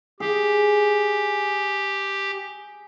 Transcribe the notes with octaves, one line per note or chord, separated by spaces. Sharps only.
G4 G#4